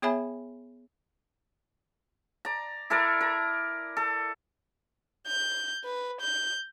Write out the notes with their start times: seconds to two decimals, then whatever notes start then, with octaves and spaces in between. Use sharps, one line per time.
0.02 B3 G#4 C#5 E5 G#5 B5
2.45 D5 A#5
2.90 E4 A4 A#4 D5
3.21 A#4
3.97 A4
5.27 G6
5.85 B4
6.21 G6